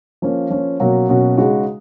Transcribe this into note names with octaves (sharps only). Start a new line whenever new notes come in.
F3 A#3 C#4
F3 A#3 C#4
B2 F#3 A#3 C#4 F#4
B2 F#3 A#3 C#4 F#4
C#3 G#3 D#4 F#4